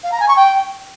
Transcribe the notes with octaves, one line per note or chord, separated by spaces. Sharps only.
F5
A#5
G#5
C#6
G5